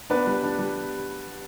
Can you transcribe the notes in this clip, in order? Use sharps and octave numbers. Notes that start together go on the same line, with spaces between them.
B3 D4 B4
G3
D4
G3